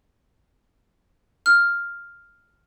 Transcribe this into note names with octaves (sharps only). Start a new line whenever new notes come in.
F6